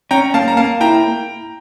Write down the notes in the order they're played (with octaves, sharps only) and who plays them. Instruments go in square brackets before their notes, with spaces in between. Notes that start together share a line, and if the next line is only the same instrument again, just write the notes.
[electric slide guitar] C#4 [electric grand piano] G5 A#5
[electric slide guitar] A#3 [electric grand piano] F5 A5
[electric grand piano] A#5
[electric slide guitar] A#3 [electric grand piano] F5 A5
[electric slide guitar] E4 [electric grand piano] G5 A#5